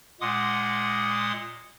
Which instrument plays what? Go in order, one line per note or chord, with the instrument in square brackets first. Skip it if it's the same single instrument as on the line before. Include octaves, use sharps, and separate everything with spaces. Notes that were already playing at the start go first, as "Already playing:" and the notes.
[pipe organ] A#2 G#3 F#5 C6 D6 D#6